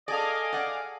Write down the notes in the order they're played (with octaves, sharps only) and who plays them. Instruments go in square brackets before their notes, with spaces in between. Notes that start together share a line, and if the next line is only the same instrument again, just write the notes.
[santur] G#4 A4 [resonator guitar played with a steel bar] D5 [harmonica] D#5 [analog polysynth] F5 G#5 D6
[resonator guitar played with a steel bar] D5 F#5